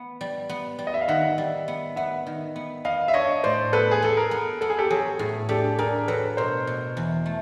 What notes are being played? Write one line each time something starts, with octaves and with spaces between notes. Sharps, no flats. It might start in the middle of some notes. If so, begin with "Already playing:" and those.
Already playing: B3
G3
B3
G3
D#5
E5
F5
D#3 E5 F#5
G3
B3
B3 E5 F#5
D#3
B3
B3 D#5 F5
E5
D4 C#5 D#5
A2 C5 D5
B3 A4 B4
G#4
B3 A4
G#4 A#4
B3
B3 A4
G#4
G4 A4
F#3 G#4
A2 G#4
D4 G4 A4
D4 G#4 A#4
F#3 A4 B4
B2 A#4 C5
B2
E2
A3